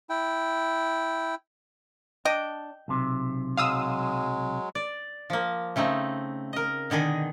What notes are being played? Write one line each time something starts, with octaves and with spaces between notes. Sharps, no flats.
E4 G5
D4 D#5 G5
B1 C3
F#3 G#3 F5 D#6 E6
D5
F3 A#3
C#3 A3 C4 D#4
A#4 D#5
B2 D3 D#3 G#4 D#5